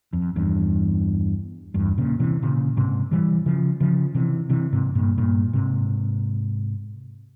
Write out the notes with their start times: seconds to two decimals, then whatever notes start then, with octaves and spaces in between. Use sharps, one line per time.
0.13 F2
0.36 E2 G2
1.74 E2 G2
1.98 A#2 C#3
2.20 C3 E3
2.42 A#2 C#3
2.77 G#2 C3
3.11 E3 G3
3.46 C#3 F3
3.80 C#3 F3
4.14 C3 E3
4.49 C3 E3
4.73 G#2 C3
4.95 G2 A#2
5.18 G2 A#2
5.53 G#2 C3